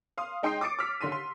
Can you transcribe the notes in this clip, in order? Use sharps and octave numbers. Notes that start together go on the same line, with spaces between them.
F5 C6 D#6
G#3 D#4 G5 C6 D#6 C7
D6 D#6 A6 C#7 D7
D6 E6 F6 B6
D#2 D3 C6 B6 D#7
C6